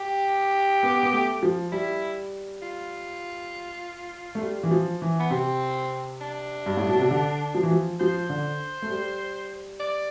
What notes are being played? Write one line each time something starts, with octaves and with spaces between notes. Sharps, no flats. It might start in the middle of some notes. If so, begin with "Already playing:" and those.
Already playing: G4
B3
B3
A3
F3
G3 E4
F4
A3
G3
E3
F3
E3
B3
C3 C4
D4
G2
A2
B2
C3
D3
F3
E3
F3
F3 C5
D3
A3
G3
D5